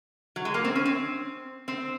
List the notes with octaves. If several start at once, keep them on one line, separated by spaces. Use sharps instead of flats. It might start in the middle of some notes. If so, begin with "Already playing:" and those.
F#3
G#3
A#3
C4
C#4
C4
C4